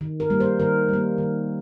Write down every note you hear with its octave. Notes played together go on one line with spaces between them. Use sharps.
D#3
A#4
G3 A#3
C5
D#3 A#4
G3 A#3
D#3